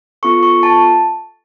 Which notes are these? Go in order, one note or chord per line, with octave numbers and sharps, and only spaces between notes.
B3 F4 A4 C#6
C#6
A5